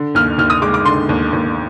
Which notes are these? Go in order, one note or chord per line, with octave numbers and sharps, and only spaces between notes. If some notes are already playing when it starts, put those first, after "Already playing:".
Already playing: D3
D#2 F6
D#2 F6
D#6
G#3 D6
D6
D3 C6
D#2
D#2